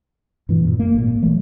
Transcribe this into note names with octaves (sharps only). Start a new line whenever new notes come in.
G2 A#2 E3
F#2 A#2
A#3
G#1 A#2
E3 F#3 A3